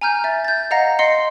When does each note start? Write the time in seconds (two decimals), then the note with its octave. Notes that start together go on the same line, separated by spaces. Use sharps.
0.01 G#5 A#5 F6 G6
0.24 E5 A6
0.45 G6 A6
0.71 D#5 F5 F#5 A#5 A#6
0.99 D#5 C6 C7 C#7